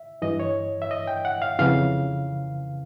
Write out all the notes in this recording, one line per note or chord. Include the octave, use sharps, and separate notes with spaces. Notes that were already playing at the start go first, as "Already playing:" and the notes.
Already playing: E5
G2 E3 D#5
C#5
E5
D#5
G5
F#5
F5
F2 C#3 E3 F5